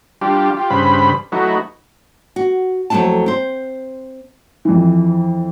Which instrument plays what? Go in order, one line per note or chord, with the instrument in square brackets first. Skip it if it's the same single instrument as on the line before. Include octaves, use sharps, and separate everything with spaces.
[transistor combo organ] G3 D4 F4 G4
F4 G4
G2 C#3 B4 C5 B5
F#3 A3 D#4 E4 F#4 B4
[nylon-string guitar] F#4
F2 F#3 A3 D4 E4 A5
C4 C5
[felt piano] F2 E3